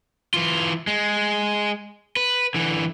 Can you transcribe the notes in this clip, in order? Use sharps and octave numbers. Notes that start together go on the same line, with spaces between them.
E3 F4
G#3
B4
D3 E3